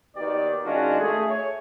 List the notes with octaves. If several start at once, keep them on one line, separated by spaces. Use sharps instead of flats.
D#2 B2 D#3 G4 D5
D#3 G#3 C#4 D4 F4 F#4
A3 G#4
C#5